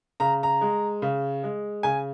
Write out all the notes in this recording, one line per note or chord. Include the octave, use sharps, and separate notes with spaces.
C#3 A#5
A#5
G#3
C#3
G#3
C#3 G#5